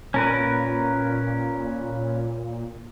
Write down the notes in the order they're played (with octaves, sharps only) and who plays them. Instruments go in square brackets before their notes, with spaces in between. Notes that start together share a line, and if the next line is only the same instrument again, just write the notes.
[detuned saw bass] A#2 [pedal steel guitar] C#4 A#4 B4